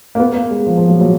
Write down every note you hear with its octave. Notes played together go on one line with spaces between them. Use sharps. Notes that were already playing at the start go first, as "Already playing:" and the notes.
A#3
B3
A#3
G#3
F3
F3
F#3
F#3